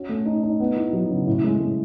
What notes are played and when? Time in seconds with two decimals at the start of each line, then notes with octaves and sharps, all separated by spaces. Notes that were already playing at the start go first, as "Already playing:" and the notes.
Already playing: C#4 F#4
0.09 A3
0.26 D#4
0.43 D#4
0.60 B3
0.77 E4
0.93 F#3
1.10 C#3
1.27 A2
1.44 G#3
1.60 G#3